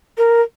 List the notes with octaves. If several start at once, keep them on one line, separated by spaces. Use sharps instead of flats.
A#4